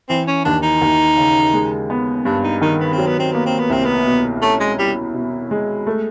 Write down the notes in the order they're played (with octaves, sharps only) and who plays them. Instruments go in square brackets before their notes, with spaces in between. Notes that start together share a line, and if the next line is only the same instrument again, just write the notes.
[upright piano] E3 [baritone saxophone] C4
[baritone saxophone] C#4
[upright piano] D#2 [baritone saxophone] D4
[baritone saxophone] D#4
[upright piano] D#2
C#3
G#3
B3
[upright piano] G2 [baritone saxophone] D4
[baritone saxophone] D#4
[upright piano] D#3 [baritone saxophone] D#4
[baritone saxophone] B3
C4
[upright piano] F#3
[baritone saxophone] B3
C4
[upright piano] A#3 [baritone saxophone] B3
[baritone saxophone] C4
B3
[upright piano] C2 [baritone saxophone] C4
[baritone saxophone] B3
[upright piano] B2
[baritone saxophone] A3 [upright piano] C#4
[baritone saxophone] G#3
[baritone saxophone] G3 [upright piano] E4
[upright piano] B2
G#3
A3